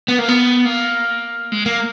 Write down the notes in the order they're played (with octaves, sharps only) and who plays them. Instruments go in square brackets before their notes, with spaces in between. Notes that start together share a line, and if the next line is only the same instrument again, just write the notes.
[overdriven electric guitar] B3
A#3
B3
A#3
G#3
A#3